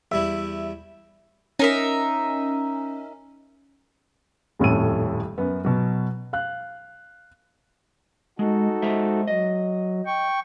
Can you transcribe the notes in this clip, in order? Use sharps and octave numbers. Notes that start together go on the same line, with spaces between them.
E2 G3 E4 E5
C#4 D#4 A#4 E5
D#1 F2 A2 C#4 A4 D#7
F#2 B3
B2 F#3
F5 F#6
G#3 D#4 F#4 A4
G#3 C5 E5
F#3 D#5
G5 C#6